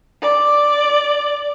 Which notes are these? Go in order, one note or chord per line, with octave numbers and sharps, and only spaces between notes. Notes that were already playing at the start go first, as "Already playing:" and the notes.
D5